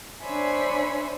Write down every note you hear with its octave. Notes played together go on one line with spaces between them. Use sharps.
D4 C5 C#5 E5 G#5 B5